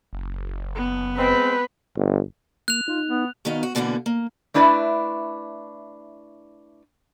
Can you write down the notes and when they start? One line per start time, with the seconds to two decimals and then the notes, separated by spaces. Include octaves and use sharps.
0.13 F#1
0.75 B3
1.18 G#3 C4 B4
1.96 G1
2.68 A#3 F#6 F7
2.88 D#4 F4
3.07 B3
3.45 B2 D#3 B3 D#4 D#5 F5
3.63 F#4
3.75 B2 D3 E3 A#3 B3 F#5
4.06 A#3
4.54 A3 D4 E4 B4 D5 E5